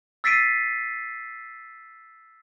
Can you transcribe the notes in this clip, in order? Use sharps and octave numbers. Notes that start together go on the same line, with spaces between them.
E6 A6 B6 C7 D7 D#7